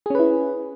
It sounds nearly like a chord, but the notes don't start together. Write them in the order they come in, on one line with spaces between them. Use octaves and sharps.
G#4 C#4 B4 E4